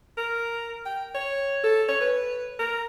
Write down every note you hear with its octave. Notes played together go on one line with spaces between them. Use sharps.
A#4
G5
C#5
A4
C#5
B4
A#4